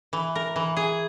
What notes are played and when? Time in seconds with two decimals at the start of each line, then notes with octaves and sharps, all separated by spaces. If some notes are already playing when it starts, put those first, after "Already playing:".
0.13 E3
0.36 A#4
0.56 E3
0.77 G#4